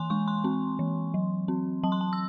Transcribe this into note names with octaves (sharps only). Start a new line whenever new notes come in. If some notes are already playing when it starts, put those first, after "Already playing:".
Already playing: E3 G#5 C6
G#3 C#6
C6
C4
E3
F#3
C4
F#3 A5
C6
A5
E6